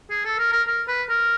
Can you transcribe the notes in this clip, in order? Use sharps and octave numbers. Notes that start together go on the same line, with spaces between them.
G#4
A4
A#4
A#4
A#4
B4
A#4